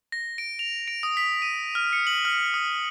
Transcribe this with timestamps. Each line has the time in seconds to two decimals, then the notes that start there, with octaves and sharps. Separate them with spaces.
0.12 A#6
0.38 D7
0.59 F7
0.88 D7
1.03 D#6
1.17 B6
1.42 D#7
1.75 F6
1.93 C#7
2.07 F#7
2.25 F6
2.54 D#6